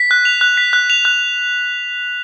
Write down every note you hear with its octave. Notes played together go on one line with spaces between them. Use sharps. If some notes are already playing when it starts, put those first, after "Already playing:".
Already playing: B6
F#6
F7
F#6
B6
F#6
F7
F#6